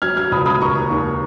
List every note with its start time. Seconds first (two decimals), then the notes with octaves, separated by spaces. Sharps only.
0.02 F#3 F6 G#6
0.16 F#3 F6 G#6
0.32 C#2 B5 D#6
0.46 C#2 B5 D#6
0.61 D#2 A#5 C#6
0.76 D#2
0.90 D#2